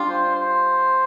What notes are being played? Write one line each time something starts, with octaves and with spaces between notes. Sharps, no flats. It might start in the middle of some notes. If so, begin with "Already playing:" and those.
Already playing: G3 D4 F4
C5
C5